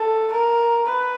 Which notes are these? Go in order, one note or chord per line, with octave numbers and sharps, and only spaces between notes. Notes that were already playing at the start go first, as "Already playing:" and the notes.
Already playing: A4
A#4
B4